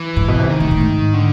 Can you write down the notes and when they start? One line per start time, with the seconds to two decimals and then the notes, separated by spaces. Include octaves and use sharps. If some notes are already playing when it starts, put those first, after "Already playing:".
Already playing: E3
0.16 G#2
0.28 B2
0.38 C3
0.49 D#3
0.60 A2
0.71 A2
0.81 G#2
1.14 D3